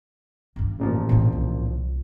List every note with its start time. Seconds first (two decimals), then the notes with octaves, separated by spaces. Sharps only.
0.56 G1 G2
0.79 A1 A#2 F3
1.09 A2 C4
1.32 C2